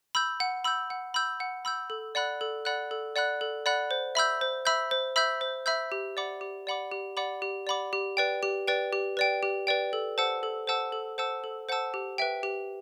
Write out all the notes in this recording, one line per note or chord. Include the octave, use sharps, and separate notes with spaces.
B5 E6 G6
F#5
B5 E6 G6
F#5
B5 E6 G6
F#5
B5 E6 G6
A4
D5 F#5 B5 F#6
A4
D5 F#5 B5 F#6
A4
D5 F#5 B5 F#6
A4
D5 F#5 B5 F#6
C5
E5 B5 E6 G6
C5
E5 B5 E6 G6
C5
E5 B5 E6 G6
C5
E5 B5 E6 G6
G4
D5 F#5 B5 D6
G4
D5 F#5 B5 D6
G4
D5 F#5 B5 D6
G4
D5 F#5 B5 D6
G4
B4 D5 G5
G4
B4 D5 G5
G4
B4 D5 G5
G4
B4 D5 G5
A4
C5 F#5 A5 E6
A4
C5 F#5 A5 E6
A4
C5 F#5 A5 E6
A4
C5 F#5 A5 E6
G4
B4 E5 G5
G4